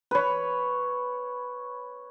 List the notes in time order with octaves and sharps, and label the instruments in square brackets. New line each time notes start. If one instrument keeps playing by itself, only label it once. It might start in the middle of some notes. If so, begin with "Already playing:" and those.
[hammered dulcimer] B4 C#5